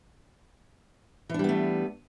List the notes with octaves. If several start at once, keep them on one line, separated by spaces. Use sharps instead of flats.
E3 G3 A3 B3 D4